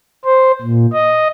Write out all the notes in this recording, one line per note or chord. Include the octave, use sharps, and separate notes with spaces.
C5
A#2
D#5